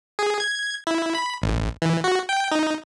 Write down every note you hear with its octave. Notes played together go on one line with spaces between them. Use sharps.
G#4
G#6
E4
B5
A1
E3
F#4
G5
D#4